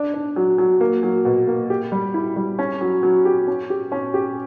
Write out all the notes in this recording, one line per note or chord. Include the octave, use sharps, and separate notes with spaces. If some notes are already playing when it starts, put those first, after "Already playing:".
Already playing: D4
D4
F#3
F#3
A#3
F#3
B2
A#3
G4
G3
E4
G3
C#4
F#3
F#3
G4
C#4
G4
C#4
G4